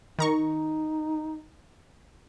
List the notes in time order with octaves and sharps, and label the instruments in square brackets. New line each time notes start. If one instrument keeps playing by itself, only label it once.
[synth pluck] D#3 A#5 C#6 [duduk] D#4